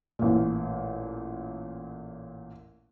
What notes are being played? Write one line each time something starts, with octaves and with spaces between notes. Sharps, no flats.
A1 A#2